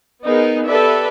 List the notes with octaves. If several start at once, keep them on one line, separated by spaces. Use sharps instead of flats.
B3 D#4 G#4 A#4
G4 A4 B4 D5 E5